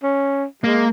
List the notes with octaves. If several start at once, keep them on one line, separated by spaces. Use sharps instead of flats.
C#4
G#3 A#3